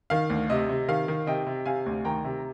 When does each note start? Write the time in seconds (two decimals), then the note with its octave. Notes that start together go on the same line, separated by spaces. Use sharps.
0.10 D#3 F5
0.30 D2
0.50 C3 D#5
0.69 C3
0.88 D#3 F5
1.08 D#3
1.27 C3 D#5 G5
1.47 C3
1.66 C3 F5 G#5
1.86 D2
2.05 D#3 G5 A#5
2.24 C3